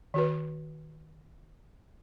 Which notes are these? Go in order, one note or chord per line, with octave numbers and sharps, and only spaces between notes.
D#3 F#4 B4